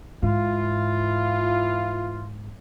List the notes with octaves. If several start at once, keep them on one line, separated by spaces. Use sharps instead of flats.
G#2 E3 F4